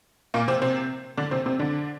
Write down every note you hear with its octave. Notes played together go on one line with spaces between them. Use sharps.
A#2 A#3
C3 C4
C3 C4
D3 D4
C3 C4
C3 C4
D3 D4